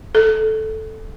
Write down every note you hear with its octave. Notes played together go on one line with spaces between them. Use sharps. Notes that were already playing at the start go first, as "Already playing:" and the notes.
A4